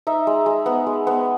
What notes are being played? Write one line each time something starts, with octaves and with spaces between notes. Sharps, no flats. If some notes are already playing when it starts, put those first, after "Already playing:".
D#4 E5
G#3
G#3
B3
G#3
B3